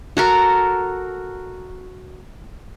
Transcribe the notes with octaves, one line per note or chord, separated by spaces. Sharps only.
F#4 A4 A#4